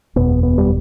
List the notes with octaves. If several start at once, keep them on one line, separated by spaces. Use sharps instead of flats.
F#1 E2 B2 B3
B3
G3